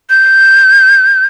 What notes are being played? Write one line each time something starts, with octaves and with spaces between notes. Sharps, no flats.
G6